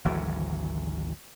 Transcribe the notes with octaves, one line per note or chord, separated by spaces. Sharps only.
G#1 D2 E3 F#3